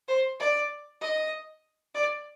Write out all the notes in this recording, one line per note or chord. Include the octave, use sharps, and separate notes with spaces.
C5
D5
D#5
D5